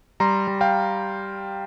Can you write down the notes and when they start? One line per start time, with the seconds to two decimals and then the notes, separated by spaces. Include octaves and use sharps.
0.20 G3 A#5 C6
0.47 G3
0.61 F5 G5